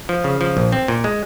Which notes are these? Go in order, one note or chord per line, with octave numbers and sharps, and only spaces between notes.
F3
C#3
F3
A#1
C4
A#2
G#3